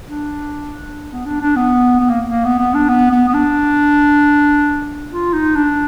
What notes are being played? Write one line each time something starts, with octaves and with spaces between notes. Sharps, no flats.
D4
B3
D4
D4
B3
B3
A#3
A#3
B3
B3
D4
B3
B3
B3
D4
F4
D#4
D4